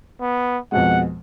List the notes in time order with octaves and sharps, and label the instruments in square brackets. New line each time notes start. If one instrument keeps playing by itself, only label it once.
[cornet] B3
[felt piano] F2 B2 G#3 [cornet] F#5